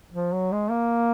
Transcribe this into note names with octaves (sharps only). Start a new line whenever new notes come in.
F3
F#3
G#3
A#3